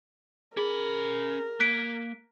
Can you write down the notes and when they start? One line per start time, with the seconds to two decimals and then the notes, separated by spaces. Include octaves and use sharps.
0.57 C#4 G#4 A#4 B5
1.60 A#3 F#6 B6 D7